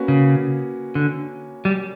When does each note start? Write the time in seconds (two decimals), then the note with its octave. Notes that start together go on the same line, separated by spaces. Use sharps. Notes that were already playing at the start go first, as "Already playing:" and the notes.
Already playing: A#3 C#4 F#4 B4
0.08 C#3
0.95 D3
1.65 G3